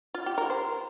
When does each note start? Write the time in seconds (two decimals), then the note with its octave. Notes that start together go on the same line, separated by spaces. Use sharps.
0.14 F4
0.26 G4
0.38 A#4
0.50 C5